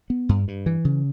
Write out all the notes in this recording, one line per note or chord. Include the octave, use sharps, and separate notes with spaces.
B3
G2
G2
E3
C#3